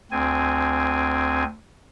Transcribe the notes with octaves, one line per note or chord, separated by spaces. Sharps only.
D2 C4 G#5